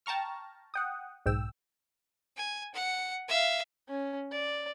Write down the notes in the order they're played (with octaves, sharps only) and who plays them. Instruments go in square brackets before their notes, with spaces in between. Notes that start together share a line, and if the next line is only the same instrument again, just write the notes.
[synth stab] G5 A5 A#5 C#6 F6
F#5 G5 D#6
B1 G#2 G5 E6
[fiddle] G#5
F#5
E5 F5
[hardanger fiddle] C#4
D5